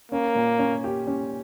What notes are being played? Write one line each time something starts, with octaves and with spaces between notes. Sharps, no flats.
A#3 C#4
A#2
C#4
G4
C#4